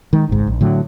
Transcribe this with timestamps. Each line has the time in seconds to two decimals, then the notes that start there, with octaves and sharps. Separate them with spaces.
0.13 D#3 G#3
0.29 G#1 C#2 G#2
0.47 A#1
0.61 A2 D3 F#3